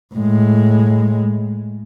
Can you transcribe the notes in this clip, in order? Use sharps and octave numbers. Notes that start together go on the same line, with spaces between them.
A2 G#3